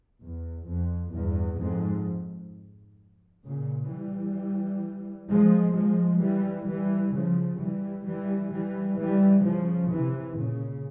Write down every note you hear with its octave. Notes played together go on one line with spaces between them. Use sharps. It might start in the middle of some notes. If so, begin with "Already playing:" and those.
E2
F2
E2 G2
F2 G#2
A#2 C#3
E3 G3
F3 G#3
F3 G#3
E3 G3
E3 G3
C#3 F3
E3 G3
E3 G3
E3 G3
E3 G3
C#3 F3
C3 E3
A#2 C#3